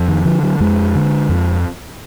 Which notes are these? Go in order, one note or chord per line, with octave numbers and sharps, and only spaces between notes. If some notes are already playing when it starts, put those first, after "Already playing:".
Already playing: F2
D#3
D3 F3
F#3
F2 G#3
D3
F2